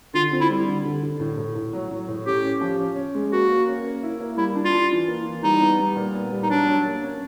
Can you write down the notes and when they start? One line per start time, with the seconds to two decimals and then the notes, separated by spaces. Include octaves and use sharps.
0.14 D3 F4
0.32 C4
0.41 E4
0.50 G3
0.68 D3
0.85 D3
1.03 D3
1.20 A2
1.38 A2
1.55 A2
1.73 F#3
1.91 F#3
2.08 A2
2.26 C#4 G4
2.43 C#4
2.61 F3
2.79 C#4
2.96 C#4
3.15 G#3
3.32 A#3 F#4
3.49 A#3
3.68 C#4
3.84 A#3
4.03 E4
4.21 A#3
4.37 G3 E4
4.56 D4
4.65 F4
4.73 D4
4.91 E3
5.08 A#3
5.26 E3
5.43 G3 D#4
5.61 B3
5.79 G3
5.96 A#2
6.14 B3
6.32 G3
6.43 D#4
6.49 F#3 D4
6.67 F#3
6.85 A#3
7.03 C#4